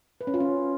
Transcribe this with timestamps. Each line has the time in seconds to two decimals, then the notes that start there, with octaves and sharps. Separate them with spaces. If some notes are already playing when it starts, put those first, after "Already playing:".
0.21 B4
0.27 C#4
0.34 F4
0.40 C#4